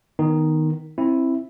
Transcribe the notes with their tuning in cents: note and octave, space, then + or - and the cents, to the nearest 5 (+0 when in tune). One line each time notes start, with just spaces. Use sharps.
D#3 +0 B3 +0 D#4 +0
C4 +25 E4 +0